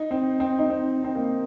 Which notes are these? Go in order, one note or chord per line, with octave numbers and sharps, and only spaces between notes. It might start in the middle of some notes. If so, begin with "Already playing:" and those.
Already playing: D#4
C4
C4
D#4
C4
C4
A#3